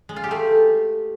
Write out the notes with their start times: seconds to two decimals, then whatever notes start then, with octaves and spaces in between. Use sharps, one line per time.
0.09 G#3
0.16 F4
0.24 G4
0.31 A3